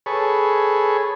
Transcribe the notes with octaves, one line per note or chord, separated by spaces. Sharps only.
G#4 A4 B4 C#5